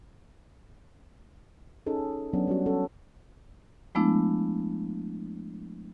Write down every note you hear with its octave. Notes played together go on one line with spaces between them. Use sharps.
C#4 D#4 G#4 A4
F#3 B3 C#4 D4
G3 C#4 F#4
C#4 A4
F3 G#3 A3 B3 D4 E4